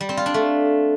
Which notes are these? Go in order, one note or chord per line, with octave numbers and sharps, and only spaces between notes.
G3
C4
F4
D4
A3